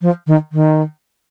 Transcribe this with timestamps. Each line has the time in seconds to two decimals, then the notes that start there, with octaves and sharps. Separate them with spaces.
0.02 F3
0.27 D#3
0.52 D#3